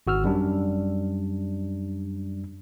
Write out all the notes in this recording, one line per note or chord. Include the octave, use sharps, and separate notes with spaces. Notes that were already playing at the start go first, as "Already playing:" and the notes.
G#1 F#4 E6 F6
F#2 G3 D4